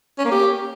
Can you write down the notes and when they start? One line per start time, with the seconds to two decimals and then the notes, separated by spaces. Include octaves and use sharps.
0.18 C#4
0.25 A#3
0.32 G4